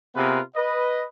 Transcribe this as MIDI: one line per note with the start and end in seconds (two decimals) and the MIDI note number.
0.15 0.40 48
0.15 0.40 59
0.15 0.40 65
0.15 0.40 68
0.15 0.40 70
0.15 0.40 71
0.55 1.05 71
0.55 1.05 75